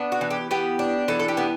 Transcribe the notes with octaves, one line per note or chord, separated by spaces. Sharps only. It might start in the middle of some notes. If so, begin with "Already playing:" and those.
Already playing: B3 D4
F#4
E3
G4
B3 G4
D4
E3 A4
A4
G4
B3